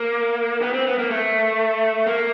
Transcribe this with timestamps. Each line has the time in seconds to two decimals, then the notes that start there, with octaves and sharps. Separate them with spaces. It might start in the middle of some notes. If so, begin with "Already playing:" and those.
Already playing: A#3
0.62 B3
0.73 C4
0.87 B3
0.99 A#3
1.11 A3
2.07 A#3